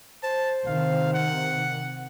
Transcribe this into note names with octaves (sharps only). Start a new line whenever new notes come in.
C5 A5
C3 D#3 F5
F#5